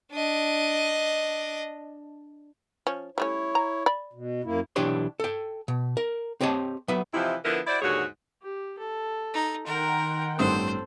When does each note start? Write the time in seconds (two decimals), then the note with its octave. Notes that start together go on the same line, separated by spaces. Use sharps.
0.13 D4 D#5
2.87 F3 C#4
3.18 G3 A3 C#4 E4 C#5
3.55 A#5
3.86 D5 B5
4.13 B2
4.44 F#2 A#3 E4
4.76 B1 E3 D4 G4 C#5 C6
5.20 A4 G5
5.68 B2
5.97 A#4
6.41 C4 G4 C#5 D#5 A5
6.88 F#3 B3 B4 E5
7.13 C3 E3 F3 D#4 E4
7.44 D3 F3 B3 E4 A#4 B4
7.66 E4 F#4 C5 D5
7.82 D#2 G#2 D3 F#4 G#4 C#5
8.42 G4
8.79 A4
9.34 D#4
9.66 D#3 A#4 F#5 G5 A#5 C6
10.39 A1 G2 C4 A4 C5 D#6